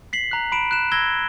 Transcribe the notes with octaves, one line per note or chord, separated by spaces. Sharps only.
B6 C7 F#7
A#5 F#6
B5 D7 E7
F#6 E7
B5 E6 G#6 A#6 G7